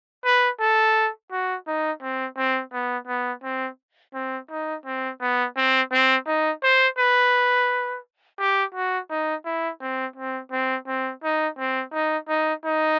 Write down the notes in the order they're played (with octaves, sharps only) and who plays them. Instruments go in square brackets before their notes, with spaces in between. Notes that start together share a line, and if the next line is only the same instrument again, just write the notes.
[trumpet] B4
A4
F#4
D#4
C4
C4
B3
B3
C4
C4
D#4
C4
B3
C4
C4
D#4
C5
B4
G4
F#4
D#4
E4
C4
C4
C4
C4
D#4
C4
D#4
D#4
D#4